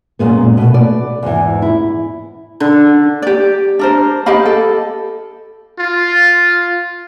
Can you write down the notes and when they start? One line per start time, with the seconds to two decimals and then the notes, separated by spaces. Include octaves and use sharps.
0.19 F#2 A#2 G#3 B3
0.57 B2 A3
0.74 D5
1.23 E2 G#2 E3
1.62 E4
2.60 D3
3.22 G4 D5
3.79 D4 A#4 C5
4.26 G4 D#5 F5 B5
4.46 A4
5.79 F4